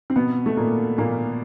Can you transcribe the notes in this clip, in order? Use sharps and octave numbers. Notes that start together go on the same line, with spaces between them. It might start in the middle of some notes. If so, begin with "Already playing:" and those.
C4
B2 B3
A3
A#2 A#3
A#2 A#3